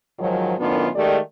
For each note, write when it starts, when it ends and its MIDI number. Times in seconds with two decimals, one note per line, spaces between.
0.19 0.53 44
0.19 0.53 51
0.19 0.53 53
0.19 0.53 54
0.58 0.88 42
0.58 0.88 45
0.58 0.88 51
0.58 0.88 59
0.58 0.88 62
0.58 0.88 65
0.95 1.18 51
0.95 1.18 56
0.95 1.18 57
0.95 1.18 67
0.95 1.18 74